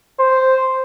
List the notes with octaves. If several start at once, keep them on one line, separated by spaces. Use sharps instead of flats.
C5